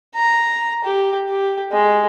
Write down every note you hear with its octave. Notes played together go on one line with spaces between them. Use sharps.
A#5
G4
G4
G#3